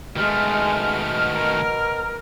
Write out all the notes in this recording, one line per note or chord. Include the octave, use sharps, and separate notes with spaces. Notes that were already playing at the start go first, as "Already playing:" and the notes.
B2 D#3 G#3 A3 F6
A#4